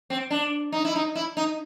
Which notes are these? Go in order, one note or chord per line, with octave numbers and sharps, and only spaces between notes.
C4
D4
D#4
E4
D#4
E4
D#4